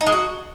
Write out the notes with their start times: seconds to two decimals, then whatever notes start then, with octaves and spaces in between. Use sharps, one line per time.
0.01 D#4
0.07 G#3
0.12 F#4